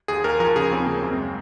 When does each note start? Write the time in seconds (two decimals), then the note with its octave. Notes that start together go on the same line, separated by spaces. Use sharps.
0.08 D#2 G#4
0.24 D#2 A#4
0.40 F3 A#4
0.56 C#3 G#4
0.71 D#2 C4
0.86 C#3 A#3
1.02 F#2 C4
1.17 G#3